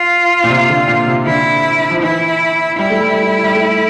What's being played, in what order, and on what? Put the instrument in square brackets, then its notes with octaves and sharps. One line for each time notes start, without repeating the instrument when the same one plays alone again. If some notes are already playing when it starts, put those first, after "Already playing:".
Already playing: [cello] F4
[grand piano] A#2
C3
D3
A#2
C3
[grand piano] D3 [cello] E4
[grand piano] F3
[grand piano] E3 [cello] E4
[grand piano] G3 [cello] E4
[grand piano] A3
G3
G3
A3